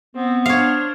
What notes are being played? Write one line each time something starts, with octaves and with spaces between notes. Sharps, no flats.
B3 C4
D4 C5 C#5 F5